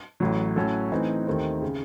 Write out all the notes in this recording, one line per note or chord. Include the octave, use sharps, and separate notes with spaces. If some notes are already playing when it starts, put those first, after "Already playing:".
A1 A2 F#3
A2 F#3 C#4 F#4 A4
A2 E3 C4 D#4
D#2 D#3 A3 C4 D#4
C#3